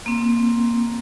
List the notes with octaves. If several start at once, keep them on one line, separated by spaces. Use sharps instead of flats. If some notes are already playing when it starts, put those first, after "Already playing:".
A#3 C4